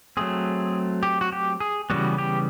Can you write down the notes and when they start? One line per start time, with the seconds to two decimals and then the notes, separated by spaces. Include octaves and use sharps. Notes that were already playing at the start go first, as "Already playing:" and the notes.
0.17 F#3 A3 C4 G#4
1.03 G4
1.21 F#4
1.32 G4
1.60 G#4
1.90 C#3 E3 G3 B3 F#4
2.18 G4